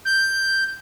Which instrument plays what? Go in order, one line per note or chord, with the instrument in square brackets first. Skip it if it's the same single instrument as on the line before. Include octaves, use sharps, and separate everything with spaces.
[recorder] G6